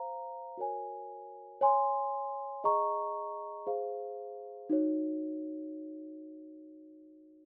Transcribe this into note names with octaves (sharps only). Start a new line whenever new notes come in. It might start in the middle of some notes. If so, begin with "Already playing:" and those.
Already playing: C5 F5 A#5
F#4 A#4 C#5 G#5
C#5 G#5 C6
G#4 D#5 A#5 C#6
G#4 C5 F5
D#4 F#4 C#5